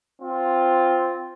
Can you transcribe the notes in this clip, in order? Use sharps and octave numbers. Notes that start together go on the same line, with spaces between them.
C4 F4